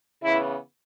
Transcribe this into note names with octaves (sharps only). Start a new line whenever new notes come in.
C#3 E3 B3 E4